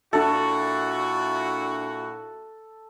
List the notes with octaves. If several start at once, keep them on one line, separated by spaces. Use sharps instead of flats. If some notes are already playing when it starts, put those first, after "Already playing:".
A#2 D4 E4 F#4 A4 E5